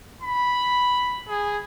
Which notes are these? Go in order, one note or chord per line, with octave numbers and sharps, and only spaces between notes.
B5
G#4